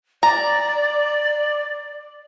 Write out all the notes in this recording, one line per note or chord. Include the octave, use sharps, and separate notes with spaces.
D5 A#5